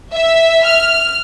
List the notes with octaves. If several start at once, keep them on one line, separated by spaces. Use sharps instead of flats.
E5
F6